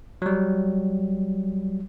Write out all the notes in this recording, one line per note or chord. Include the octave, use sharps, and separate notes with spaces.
F#3 G3